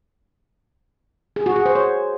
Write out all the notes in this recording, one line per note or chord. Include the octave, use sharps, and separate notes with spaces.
G#4
F#4
G#4
C5
C#5